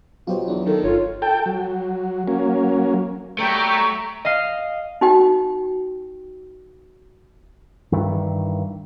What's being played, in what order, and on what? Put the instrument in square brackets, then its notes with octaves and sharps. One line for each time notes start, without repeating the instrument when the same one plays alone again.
[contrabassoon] B2 [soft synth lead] F#3 [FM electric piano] F4 G4 C5
[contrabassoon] E2 [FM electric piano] D4
[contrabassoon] D#3 [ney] A4
[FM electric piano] G1 [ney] F4 [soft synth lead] C#5
[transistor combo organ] A4 G5
F#3
F#3 A#3 C#4
[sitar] F#3 G3 B3 [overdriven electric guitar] A3 [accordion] G5 [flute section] A#5 C#6
[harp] D#5 F5
[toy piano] D#4 F#4 G5
[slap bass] G2 D#3 E3